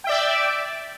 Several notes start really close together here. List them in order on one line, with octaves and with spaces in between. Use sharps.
G5 E5 D5